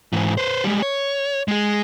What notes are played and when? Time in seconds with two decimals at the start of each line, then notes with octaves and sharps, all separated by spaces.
0.13 G#2 E3
0.37 B4 C5
0.64 G3 G#3
0.82 C#5
1.48 G#3 G#4